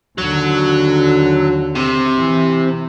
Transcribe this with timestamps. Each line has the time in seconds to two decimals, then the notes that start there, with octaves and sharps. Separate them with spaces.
0.18 D#2 D3 F#3
1.75 C3
2.18 E3